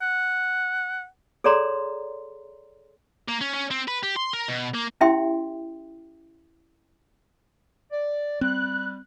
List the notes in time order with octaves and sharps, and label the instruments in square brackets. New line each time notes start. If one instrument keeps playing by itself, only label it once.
[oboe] F#5
[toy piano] G#4 A4 C#5 D5 A#5 C6
[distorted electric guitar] A#3
C#4
C#4
C4
B4
G4
C6
A#4
B2
A#3
[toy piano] C#4 E4 G4 E5 G5 C6
[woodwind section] D5
[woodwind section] G3 [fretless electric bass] C4 [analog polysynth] F#6